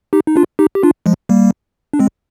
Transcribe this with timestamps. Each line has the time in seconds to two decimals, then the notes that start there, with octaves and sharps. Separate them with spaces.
0.13 D#4 G4
0.27 D#4
0.36 D4 F4
0.59 D#4 G4
0.75 G4
0.83 D4 F4
1.06 F3 G#3
1.29 G3 A#3
1.93 D4
2.00 G#3 C4